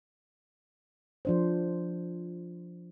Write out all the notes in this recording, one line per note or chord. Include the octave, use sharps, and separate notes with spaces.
F3 D4 C5